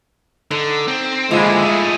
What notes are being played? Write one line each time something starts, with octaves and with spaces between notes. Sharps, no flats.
D3 D#4
C4
D#2 D3 F3 G#3 E4 F4
A3 G#4